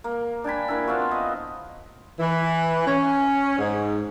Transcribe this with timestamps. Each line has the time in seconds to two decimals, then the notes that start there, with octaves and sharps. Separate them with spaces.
0.04 A#3
0.44 D4 G5 G#5 B5
0.68 A#3 D4 E4
0.88 B3 C4 F4 F#4
1.11 D#5
2.20 E3
2.86 C#4
3.59 G#2